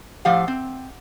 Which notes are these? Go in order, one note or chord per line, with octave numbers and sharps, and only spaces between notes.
A2 F3 G4 F5 F#5
C4